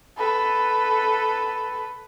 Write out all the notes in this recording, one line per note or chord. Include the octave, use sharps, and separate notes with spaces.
A4 B4